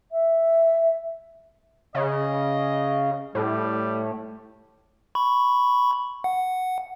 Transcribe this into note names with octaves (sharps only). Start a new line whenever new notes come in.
E5
C#3 D#5
A2 G3
B5 C#6
F#5